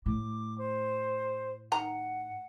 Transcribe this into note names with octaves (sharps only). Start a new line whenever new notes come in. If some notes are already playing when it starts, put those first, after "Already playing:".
A2 D6
C5
D#3 F#5 A#5